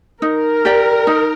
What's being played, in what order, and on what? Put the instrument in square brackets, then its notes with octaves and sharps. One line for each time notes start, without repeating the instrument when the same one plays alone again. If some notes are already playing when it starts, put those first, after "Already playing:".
[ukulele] D#4 [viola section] A#4
[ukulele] G4 D5 G5
D#4